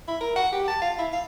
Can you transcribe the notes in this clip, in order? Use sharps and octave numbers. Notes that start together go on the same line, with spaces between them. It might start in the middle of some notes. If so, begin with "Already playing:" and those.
E4
A#4
F#5
G4
A5
F5
E4
F5